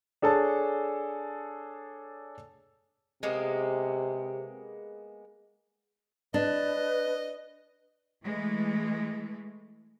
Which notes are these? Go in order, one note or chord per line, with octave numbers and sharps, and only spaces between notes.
D4 G#4 A4 C#5 A5
C3 G#3 A#3 B3
D4 B4 D#5
E3 G#3 A3